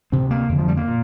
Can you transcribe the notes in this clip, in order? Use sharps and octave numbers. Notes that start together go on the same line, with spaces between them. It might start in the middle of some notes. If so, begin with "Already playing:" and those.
D2 C3 C4
A#3
F2 D3
F3
G3
A#3
A#2